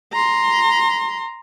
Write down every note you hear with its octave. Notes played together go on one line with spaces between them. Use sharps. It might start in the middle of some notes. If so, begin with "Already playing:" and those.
A#5 C6